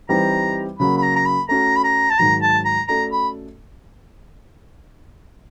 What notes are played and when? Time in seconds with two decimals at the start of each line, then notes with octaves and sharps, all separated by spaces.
0.09 E3 G3 C4 D#4 G4 A#5
0.79 C#3 F#3 A#3 B5
0.97 B5
1.03 A#5
1.16 A#5
1.25 B5
1.49 A3 C#4 F#4 A#5
1.76 B5
1.84 A#5
2.10 A5
2.18 G#2 D#3 F#3 A#5
2.42 A5
2.65 A#5
2.88 A3 C#4 F#4 A4 D5 A#5
3.12 B5